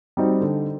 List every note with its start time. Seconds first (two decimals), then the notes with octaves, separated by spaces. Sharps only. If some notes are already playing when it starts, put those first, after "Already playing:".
0.17 G3 C4 D#4 F#4
0.41 D3